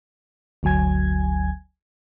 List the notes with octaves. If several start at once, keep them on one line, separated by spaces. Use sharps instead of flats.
G1 D2 F#3 G#5 G#6